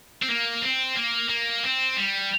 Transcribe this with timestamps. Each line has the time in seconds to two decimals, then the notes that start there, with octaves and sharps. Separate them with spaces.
0.23 C4
0.29 A#3
0.62 C4
0.96 A#3
1.29 A#3
1.63 C4
1.96 G3